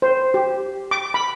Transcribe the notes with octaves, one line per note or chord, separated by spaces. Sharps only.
C5
G4
D6
B5